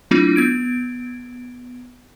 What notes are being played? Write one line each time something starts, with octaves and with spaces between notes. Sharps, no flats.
F#3 A3 C4 D4 E4 F4
B3 G#6 D7